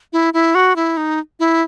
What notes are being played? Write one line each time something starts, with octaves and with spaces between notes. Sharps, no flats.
E4
E4
F#4
E4
D#4
E4